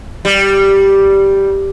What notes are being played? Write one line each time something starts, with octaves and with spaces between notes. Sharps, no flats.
G3